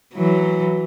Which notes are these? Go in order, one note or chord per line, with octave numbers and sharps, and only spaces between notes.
E3 F#3